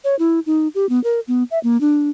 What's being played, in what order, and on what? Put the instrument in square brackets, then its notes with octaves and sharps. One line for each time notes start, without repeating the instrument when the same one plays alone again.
[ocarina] C#5
E4
D#4
G4
B3
A#4
B3
E5
A#3
D4